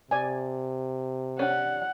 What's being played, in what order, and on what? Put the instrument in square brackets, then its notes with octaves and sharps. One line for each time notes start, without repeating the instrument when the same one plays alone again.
[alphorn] C3 [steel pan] D5 G#5
[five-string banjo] C#4 D4 G4 [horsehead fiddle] F#5